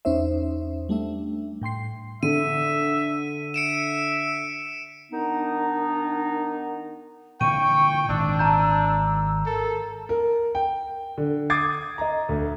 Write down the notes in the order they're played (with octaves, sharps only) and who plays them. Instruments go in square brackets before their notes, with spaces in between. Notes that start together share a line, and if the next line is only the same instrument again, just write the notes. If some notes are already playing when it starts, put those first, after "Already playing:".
[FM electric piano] E2 C#4 D#4 C5 E5
G3 A3 D4 E5
A2 G5 C6 C7
[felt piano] D3 [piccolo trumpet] E5 [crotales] D#7
[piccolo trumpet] E5 [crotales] C#7 D7 E7
[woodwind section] D#3 B3 D4 D#4
[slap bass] A#2 D3 E3 [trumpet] G5 [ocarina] C#6 [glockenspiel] D#7
[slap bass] G#1 [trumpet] D4 [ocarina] E6
[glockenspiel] A5 A#5 G6
[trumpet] A4 [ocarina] A#4
[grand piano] A#4
G5
D3
D6 D#6 G#6 A6 C7
D#5 A#5
D2